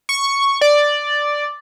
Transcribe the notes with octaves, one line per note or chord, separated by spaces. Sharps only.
C#6
D5